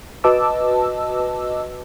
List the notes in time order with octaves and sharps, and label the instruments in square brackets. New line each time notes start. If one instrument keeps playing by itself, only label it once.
[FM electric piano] F#4 B4 D#5 A5 D6 E6